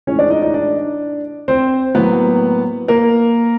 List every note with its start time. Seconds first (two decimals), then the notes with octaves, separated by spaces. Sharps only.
0.07 A2 E3 G#3 C#4 C#5
0.19 D4 D5
0.30 D#4 D#5
0.42 D#4 D#5
0.54 D4 D5
1.48 C4 C5
1.95 A2 F#3 A#3 B3 B4
2.88 A#3 A#4